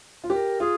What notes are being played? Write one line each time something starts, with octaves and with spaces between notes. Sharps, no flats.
F4
G4 A#4
F4 G#4